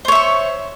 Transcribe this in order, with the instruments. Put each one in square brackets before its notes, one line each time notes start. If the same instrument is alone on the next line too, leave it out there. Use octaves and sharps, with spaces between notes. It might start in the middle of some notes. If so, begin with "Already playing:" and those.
[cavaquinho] C5
C#5
E5
C#6